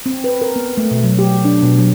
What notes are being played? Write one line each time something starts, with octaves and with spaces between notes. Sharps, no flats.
C4
B4
A#4
B3
A3
B2
F#3
G4
D4
B2
F#3